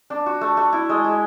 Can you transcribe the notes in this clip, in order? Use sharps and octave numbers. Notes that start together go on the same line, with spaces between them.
D4
F#4
A3
A3
E4
G#3
G#3